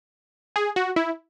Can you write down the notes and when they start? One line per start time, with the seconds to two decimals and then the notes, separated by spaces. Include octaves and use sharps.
0.56 G#4
0.76 F#4
0.96 E4